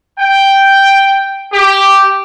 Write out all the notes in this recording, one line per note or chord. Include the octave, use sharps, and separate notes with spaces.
G5
G4